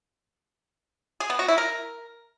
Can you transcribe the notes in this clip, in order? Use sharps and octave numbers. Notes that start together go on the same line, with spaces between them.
G#4
B3
F#4
E4
A#4